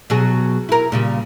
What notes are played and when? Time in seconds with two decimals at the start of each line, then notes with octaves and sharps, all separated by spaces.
0.10 B2 F#3 G#4
0.69 E4 A#4
0.92 A#2 C#3 G3